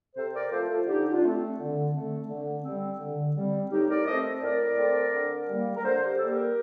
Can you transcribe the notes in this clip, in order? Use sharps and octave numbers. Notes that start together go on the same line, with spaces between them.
C3 A4 C5
A#4 D5
F3 A3 A4 C5
F4 A4
D3 D#4 G4
D4 F4
A3 C4
D3
A3 C4
D3
G3 C4
D3
G3 C4
A2 D#4 G4
A#4 D5
A3 C4 C5 D#5
A2 A#4 D5
A3 C4
D3
G3 A#3
A#4
D3 A4 C5
G4
G3 A#3 A4
G4 A#4